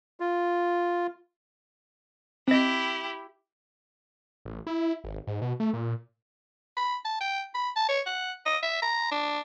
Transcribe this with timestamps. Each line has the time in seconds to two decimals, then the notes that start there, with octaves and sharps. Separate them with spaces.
0.20 F4
2.48 C4 E4 G4 D#5
4.45 A1
4.67 E4
5.04 G#1
5.27 G#2
5.42 B2
5.60 A3
5.73 A#2
6.77 B5
7.05 A5
7.20 G5
7.54 B5
7.76 A5
7.89 C#5
8.06 F#5
8.46 D#5
8.63 E5
8.82 A#5
9.11 D4